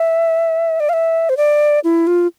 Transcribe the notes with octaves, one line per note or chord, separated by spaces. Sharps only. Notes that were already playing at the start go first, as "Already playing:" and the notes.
Already playing: E5
D5
F5
E5
C5
D5
E4
F4